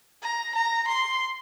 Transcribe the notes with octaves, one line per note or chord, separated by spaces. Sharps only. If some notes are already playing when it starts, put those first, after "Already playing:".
A#5
A#5
C6